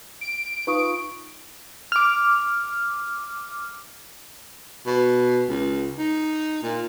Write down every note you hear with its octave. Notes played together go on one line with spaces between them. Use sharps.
D7
D#4 F4 B4 C#6 D#6
D6 F6
B2
C#2
D#4
A#2